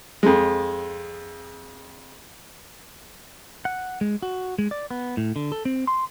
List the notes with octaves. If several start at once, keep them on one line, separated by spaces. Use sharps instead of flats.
F2 G#3
F#5
G#3
F#4
G#3
D5
B3
A2
D3
A4
C4
C6